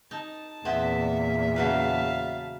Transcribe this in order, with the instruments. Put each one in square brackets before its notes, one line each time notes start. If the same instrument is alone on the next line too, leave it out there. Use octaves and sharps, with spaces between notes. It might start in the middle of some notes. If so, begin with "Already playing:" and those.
[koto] D#4 [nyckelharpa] A5
[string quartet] E2 A#2 [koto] B3 C4 E4 [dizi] E5
[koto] C#3 F#3 B4 [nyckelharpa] F5 A5